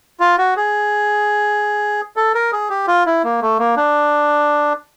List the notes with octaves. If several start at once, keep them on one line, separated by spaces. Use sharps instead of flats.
F4
F#4
G#4
A4
A#4
G#4
G4
F4
E4
A#3
A3
A#3
D4